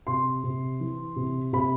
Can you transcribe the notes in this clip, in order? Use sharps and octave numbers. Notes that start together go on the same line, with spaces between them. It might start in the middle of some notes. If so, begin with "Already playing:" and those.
C3 C6
C3
E3
C3
C3 B5